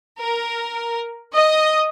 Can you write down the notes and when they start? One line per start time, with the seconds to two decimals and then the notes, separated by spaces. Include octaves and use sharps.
0.20 A#4
1.34 D#5